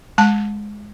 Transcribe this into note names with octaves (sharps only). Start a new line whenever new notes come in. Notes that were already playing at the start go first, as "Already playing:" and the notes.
G#3 A5